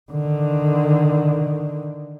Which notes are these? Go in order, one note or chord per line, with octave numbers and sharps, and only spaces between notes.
D3 D#3